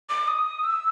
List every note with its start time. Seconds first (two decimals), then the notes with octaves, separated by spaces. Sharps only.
0.09 D6
0.28 D#6
0.64 E6